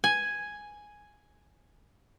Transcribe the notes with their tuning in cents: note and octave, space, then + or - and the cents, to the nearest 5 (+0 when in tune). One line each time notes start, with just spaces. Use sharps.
G#5 +0